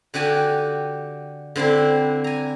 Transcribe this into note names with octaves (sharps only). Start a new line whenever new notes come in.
D3 F#4 G4 G#5 A5
D3 C4 D4 E4
G#5 A#5